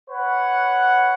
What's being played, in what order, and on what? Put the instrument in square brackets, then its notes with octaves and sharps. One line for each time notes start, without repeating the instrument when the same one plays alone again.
[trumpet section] B4 C#5 F#5